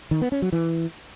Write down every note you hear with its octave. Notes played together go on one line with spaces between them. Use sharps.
D#3
B3
C#4
F#3
E3